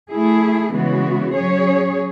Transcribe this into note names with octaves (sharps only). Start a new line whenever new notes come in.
A3 E4 G#4
C#3 E3 G#3 B3 F#4
F#3 C#4 G#4 C#5